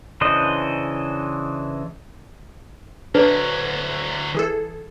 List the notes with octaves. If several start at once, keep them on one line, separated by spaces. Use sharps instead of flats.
C#3 E3 D4 C5 D#5
D2 F#3 D4 B4 D5
E3 G#4 A4